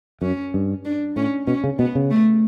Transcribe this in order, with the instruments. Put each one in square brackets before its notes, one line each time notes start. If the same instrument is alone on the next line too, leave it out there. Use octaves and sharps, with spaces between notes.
[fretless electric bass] F#2 [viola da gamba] C#4
[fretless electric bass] G2
[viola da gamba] D4
[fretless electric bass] A2 [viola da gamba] C#4
[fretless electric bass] B2 [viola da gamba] C#4
[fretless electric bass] C#3
[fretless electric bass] B2 [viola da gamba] B3
[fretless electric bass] C#3
[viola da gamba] A3